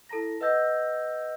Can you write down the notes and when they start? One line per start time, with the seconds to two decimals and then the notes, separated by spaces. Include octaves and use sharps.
0.09 E4 A4 A5 A#5 A#6
0.41 B4 D#5 F#5 E6 G6 A#6